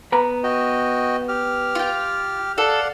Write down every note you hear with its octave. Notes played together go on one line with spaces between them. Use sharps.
B3 B4 A#5
F#4 D#5 G5
G4 F6
F4 G5
A4 D5 F5 F#5